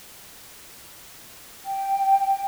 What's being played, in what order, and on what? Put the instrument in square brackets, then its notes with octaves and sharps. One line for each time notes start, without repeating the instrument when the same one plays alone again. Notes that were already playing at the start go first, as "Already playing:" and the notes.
[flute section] G5